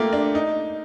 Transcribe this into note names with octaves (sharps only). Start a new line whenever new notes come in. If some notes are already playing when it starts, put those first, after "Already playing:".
Already playing: A3 A#3 F4 G4
D4
D#4